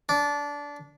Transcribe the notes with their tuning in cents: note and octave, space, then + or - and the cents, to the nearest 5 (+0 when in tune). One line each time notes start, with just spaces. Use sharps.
D4 -20